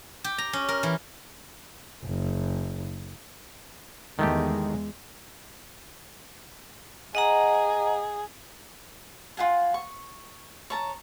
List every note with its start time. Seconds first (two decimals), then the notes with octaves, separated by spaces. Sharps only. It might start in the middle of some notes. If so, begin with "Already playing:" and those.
0.24 G4
0.38 A#5
0.53 C#4
0.68 A#4
0.83 E3
2.05 F#1
4.19 E2 D#3 G#3 A3 G4
7.15 G#4 D#5 F#5 A#5
9.37 F4 G#4 F#5 G#5
9.74 C#6
10.70 C#5 A5 A#5